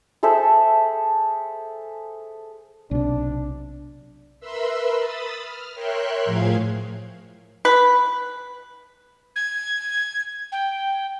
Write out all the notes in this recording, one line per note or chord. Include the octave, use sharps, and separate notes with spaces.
G#4 A4 C5 E5
B1 C3 D4
A#4 B4 E5 B5 C6 E6
B5 D#6 E6 A6
F6
A#4 C#5 E5 G5 C6 F#6
A2 F3 G#4 F5 G#6
B4
G#6
G5